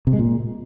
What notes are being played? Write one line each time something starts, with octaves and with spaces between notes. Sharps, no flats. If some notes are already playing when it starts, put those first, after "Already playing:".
C3
G#3
A#2